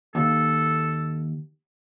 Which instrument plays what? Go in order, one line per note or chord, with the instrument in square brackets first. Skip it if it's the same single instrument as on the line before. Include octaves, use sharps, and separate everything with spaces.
[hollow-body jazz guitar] D#2 [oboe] A4